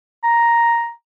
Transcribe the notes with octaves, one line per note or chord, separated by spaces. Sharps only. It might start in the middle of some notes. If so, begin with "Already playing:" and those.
A#5